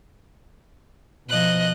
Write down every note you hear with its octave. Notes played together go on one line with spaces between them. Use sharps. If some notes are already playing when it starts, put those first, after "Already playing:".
B2 F3 D#5 F#6